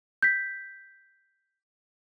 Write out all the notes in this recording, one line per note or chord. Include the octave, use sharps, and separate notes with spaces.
G6 B6